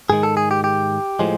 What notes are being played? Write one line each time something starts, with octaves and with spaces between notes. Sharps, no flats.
G#2 D#3 G#3 G#4
A4
G#4
G4
G4
A2 F3 G#3